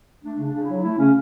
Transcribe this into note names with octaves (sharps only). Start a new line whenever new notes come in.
A3 D4
C#3
D4
C#3
E4
F#3
A3 E4
C#3 C#4